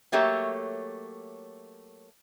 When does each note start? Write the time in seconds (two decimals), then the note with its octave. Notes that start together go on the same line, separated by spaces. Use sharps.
0.12 F#3 A3 A#3 G4 C#5 E5